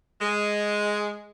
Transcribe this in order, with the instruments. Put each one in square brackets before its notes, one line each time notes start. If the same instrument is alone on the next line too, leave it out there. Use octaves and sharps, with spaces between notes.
[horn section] G#3